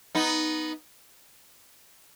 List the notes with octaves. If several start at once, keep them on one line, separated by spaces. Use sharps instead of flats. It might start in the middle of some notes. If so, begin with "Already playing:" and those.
B3 D#4